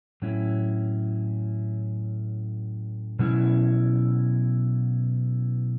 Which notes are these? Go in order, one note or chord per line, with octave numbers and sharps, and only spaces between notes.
A2 F#3 C#4 E4
B2 F#3 C#4 E4